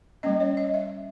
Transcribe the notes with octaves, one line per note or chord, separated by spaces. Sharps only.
G3 A#3 C#4 D#5
C#5
D#5
E5